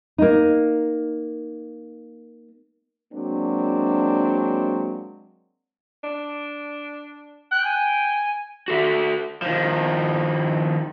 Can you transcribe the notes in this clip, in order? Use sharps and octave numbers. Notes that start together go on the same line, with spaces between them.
A#3 D#4
F#3 G#3 A#3 C4 D4
D4
G5 F#6
G#5
F#4 A4 E5
D#3 F3